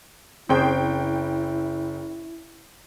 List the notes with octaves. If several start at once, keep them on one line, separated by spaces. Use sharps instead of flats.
F#1 C4 E4 G#4 C5 G5